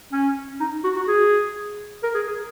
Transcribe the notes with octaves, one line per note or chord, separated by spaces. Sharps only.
C#4
D#4
F#4
F#4
G#4
A#4
G#4
G#4